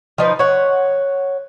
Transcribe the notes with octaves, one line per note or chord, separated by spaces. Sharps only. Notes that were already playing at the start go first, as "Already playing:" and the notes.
F3 D#4 B4
C#5 F#5